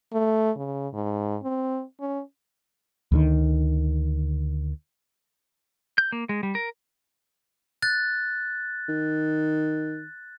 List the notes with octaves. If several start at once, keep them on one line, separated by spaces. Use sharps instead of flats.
A3
C#3
G#2
C4
C#4
D2 D3 D#3
G6
A#3
G#3
G3
A#4
F#6 A6
D#3